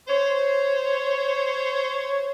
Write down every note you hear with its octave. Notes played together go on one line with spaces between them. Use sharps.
C5 C#5